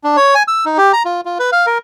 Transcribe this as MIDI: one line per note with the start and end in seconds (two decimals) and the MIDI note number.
0.04 0.17 62
0.17 0.35 73
0.35 0.43 80
0.48 0.65 88
0.65 0.78 63
0.78 0.92 67
0.93 1.03 82
1.05 1.21 65
1.25 1.38 65
1.39 1.50 71
1.52 1.66 77
1.67 1.78 70